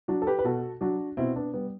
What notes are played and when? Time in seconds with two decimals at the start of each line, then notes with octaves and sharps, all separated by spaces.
0.08 F#3 D4 F#4
0.22 A4
0.27 G4 B4
0.39 B4
0.45 B2 F#4 A4
0.81 F#3 D4 F#4
1.17 B2 C4 E4
1.36 B3 D4
1.54 G3 B3